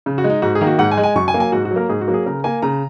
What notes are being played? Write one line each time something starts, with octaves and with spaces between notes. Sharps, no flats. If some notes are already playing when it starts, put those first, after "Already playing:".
C#3
F#4
G#3
D#4
G#2 F#4
G#4
D#3 A#3
F#4
G#2 F#5
G#5
G#3
G#5
F#2 C#6
G#5
F#3 A#3
G#5
G#2 F#4
F#4
F#3
A#3 A#4
G#2 G#4
F#4
F#3 A#3
G#4
C#3 A#4
A#3 G#5
C#3 A#5